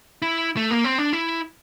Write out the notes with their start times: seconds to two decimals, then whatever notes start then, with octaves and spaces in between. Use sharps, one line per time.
0.22 E4
0.57 A3
0.71 A#3
0.84 C4
0.98 D4
1.13 E4